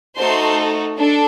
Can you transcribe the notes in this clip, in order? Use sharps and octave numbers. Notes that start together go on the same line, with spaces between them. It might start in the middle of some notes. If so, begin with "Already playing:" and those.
A3 D#4 F#4 A4 C5 C6
D4 A4